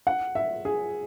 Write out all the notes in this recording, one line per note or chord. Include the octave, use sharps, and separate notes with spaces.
F#5
E5
G#4